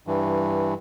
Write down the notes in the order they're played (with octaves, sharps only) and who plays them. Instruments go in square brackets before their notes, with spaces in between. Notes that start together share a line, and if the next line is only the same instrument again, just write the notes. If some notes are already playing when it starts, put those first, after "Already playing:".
[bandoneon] G2 E3